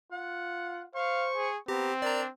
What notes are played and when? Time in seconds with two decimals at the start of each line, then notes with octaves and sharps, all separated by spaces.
0.12 F4 F#5
0.95 C5 F5 C#6
1.35 G#4
1.68 B3 C4 G4 A#5
2.02 D4 A#4 D5 A#5